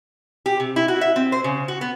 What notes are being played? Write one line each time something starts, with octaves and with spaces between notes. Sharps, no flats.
G4
C3
E4
F#4
E5
C4
C5
C#3
F#4
B3